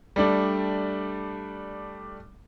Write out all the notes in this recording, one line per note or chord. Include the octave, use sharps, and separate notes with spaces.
G3 A3 D4